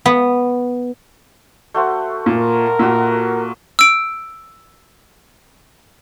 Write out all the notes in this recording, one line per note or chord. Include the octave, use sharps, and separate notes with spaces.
B3
A3 F#4 C5
A#2 A#4
A#2 F#4 E6
E6 D7